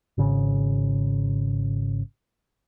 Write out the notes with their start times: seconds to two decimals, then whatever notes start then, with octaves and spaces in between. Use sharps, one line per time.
0.18 G#1 C#3